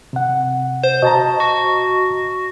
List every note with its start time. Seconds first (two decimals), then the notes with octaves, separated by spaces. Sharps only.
0.13 C3 F#5
0.84 C5
1.02 B2 D#5 A5 A#5
1.40 F#4